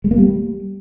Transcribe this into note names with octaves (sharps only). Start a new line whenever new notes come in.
G#3
A#3
G3